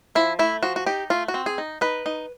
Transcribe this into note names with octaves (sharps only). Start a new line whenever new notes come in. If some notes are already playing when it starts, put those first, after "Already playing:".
F3 E4
A3 E4
F3 F#4
F#4
D#4 G4
A3 F4
F#4
C4
G#4
D#4
D#4 B4
D#4